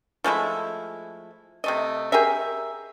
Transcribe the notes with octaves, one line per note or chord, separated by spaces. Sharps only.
F3 G#3 A3 E4
C3 A3 D#5
G4 G#4 A#4 E5